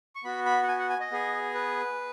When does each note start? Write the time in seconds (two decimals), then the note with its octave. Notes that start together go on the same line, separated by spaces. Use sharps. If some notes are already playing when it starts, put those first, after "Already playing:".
0.16 C#6
0.24 B3 F#4 B5
0.46 B5
0.63 F#5
0.68 G#5
0.79 F#5
0.90 G#5
1.00 D#5
1.11 B3 G#4
1.54 B4